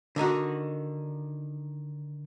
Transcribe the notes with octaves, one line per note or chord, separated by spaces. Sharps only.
D3 D#3 D#4 F#4